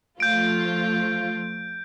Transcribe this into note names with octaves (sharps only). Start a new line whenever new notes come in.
F3 A3 F4 G6 D7